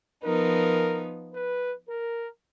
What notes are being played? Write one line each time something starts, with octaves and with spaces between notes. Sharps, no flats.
F3 B3 D#4 A#4
B4
A#4